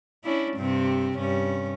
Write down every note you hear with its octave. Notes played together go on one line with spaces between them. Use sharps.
C#4 D4 E4
G2 C3 C4
G2 C#4